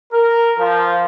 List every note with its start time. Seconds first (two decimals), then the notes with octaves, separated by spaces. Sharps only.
0.13 A#4
0.60 F3